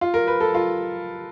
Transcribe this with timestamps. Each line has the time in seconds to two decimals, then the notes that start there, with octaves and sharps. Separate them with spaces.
0.01 F4
0.14 A#4
0.27 B4
0.40 A4
0.54 F4